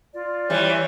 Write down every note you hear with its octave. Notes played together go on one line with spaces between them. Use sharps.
F4 D5
E3 G3 C#5